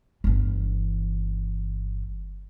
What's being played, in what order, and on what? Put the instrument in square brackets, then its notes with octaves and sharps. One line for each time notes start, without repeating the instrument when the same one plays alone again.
[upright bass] G1 E3